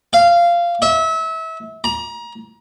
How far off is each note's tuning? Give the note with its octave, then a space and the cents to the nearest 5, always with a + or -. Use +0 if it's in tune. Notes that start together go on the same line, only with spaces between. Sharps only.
F5 -15
E5 -30
A#5 +30